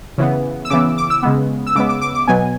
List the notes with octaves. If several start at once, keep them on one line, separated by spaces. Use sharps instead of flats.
C#3 E3 B3
E6
C#3 E3 B3 D6
D6
E6
C#3 G#3 B3
E6
C#3 G#3 B3 D6
D6
D6
D6
B2 F#3 B3 G#5